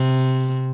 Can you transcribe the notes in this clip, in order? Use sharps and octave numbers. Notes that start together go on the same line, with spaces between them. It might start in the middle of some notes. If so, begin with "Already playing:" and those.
Already playing: C3